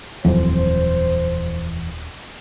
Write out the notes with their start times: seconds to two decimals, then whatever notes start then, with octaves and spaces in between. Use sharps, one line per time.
0.25 D#1 F2 E3 F#3 C4 C5